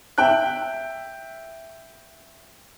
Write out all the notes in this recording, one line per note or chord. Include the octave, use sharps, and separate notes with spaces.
E5 G5 F#6